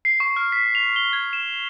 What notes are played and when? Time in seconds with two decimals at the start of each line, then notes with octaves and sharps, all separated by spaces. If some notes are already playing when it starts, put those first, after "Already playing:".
0.05 C7
0.20 C#6
0.36 F6
0.52 B6
0.75 F7
0.96 G7
1.13 G#6
1.33 E7